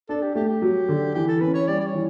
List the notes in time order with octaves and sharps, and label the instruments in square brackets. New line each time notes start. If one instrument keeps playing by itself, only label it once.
[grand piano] D4 [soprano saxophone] A4
[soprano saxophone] G4
[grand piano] A3 [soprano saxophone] G4
[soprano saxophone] G4
[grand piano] F#3
D3
[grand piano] E3 [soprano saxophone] G4
[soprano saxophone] A4
[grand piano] C#4 [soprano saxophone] B4
[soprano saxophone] C#5
[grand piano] G3 [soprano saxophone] D5
[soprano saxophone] D5
C#5
[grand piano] E3